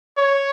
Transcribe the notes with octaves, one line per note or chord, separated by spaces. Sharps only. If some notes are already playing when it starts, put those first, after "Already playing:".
C#5